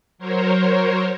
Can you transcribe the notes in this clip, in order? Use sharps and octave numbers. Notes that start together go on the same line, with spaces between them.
F#3 A#4 C5 C#5